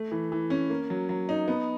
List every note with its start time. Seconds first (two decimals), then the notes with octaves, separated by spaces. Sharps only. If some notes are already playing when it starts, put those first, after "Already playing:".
Already playing: A3
0.12 E3
0.32 E3
0.50 C#4
0.70 A#3
0.90 F#3
1.09 F#3
1.29 D#4
1.48 B3